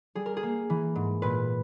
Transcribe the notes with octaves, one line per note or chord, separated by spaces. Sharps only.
G3 G#4
A#4
G#4
A#3
E3
G#2
A#2 B4